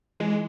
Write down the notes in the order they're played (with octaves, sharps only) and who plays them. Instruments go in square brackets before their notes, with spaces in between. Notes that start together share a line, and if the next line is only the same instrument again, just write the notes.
[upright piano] E3 [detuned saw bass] G#3